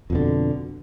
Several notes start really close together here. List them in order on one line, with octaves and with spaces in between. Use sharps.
F2 B2 D3